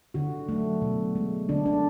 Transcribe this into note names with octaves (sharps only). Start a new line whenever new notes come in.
D3 F#4
F#3 A3
B2
G#3
D3 D4
D4